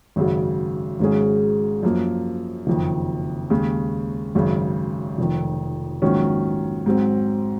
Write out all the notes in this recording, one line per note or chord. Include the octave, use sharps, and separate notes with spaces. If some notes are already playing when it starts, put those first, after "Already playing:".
G#1 F#2 C#3 F#3
G#1 G#2 F#3 C#4 G#4
F#2 F3 A#3
F#1 F2 D#3
D#2 C#3 G#3
G#1 F#2 C#3
F1 F2 D#3
A#1 G#2 D#3 F#3 C#4
G#2 F#3 C4